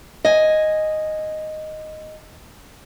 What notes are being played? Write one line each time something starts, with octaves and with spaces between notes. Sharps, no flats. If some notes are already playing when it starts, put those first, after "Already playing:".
D#5 G#5